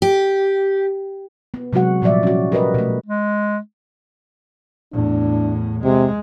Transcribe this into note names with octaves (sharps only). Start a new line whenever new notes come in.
G4
B3
C3 F#3 G#3 F#4 F#5
A#2 F3 G3 D5 E5
C#4 F#4
G4 A#4 B4 D#5
B2 A3
G#3
E2 A2 D4
C3 G#3